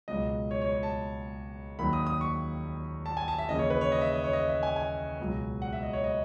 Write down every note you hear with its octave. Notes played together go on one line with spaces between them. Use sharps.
C#2 B2 F#3 D#5
C#5
C#5
C#5
A5
D#2 D#3 F#3 B5
D#6
D#6
C#6
A5
G#5
A5
E5
D#2 C#3 E3 D#5
C#5
B4
C#5
D#5
E5
D#5
C#5
D#5
E5
G#5
G#5
C#2 B2 F#3
F#5
E5
D#5
C#5
D#5